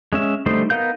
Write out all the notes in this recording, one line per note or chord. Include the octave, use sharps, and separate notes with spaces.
G#3 C#4 E5
D3 G3 A3 D#4 C5
B3 D#4 A#4 F5 G6